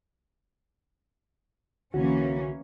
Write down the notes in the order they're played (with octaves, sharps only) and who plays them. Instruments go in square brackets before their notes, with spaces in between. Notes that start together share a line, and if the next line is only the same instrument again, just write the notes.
[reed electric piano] C2 D3 F#4 [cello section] E3 A#3 C#4